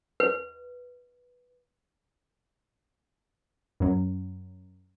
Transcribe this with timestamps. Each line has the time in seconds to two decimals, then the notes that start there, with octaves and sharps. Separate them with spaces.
0.20 B4
3.80 F#2 F#3